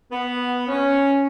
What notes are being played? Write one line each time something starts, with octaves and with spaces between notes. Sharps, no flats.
B3
C#4